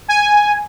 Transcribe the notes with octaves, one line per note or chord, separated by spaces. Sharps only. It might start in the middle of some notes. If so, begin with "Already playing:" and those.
G#5